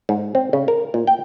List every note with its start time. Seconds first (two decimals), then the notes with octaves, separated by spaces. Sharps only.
0.09 G#2
0.35 C4
0.53 C#3
0.68 A#4
0.94 A#2
1.07 G5